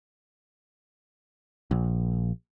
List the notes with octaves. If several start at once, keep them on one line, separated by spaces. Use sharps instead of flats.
A#1